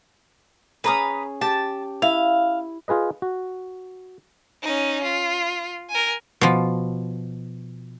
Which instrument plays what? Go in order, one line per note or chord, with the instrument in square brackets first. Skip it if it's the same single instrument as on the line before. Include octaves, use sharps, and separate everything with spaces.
[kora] C#4 G#4 [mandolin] B4 A#5 D#6
[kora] G4 [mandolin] A5
[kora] E4 [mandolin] F5
[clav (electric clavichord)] F4 G#4 B4 D#5
F#4
[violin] C#4 D#4
F4
A#4 G#5
[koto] B2 F3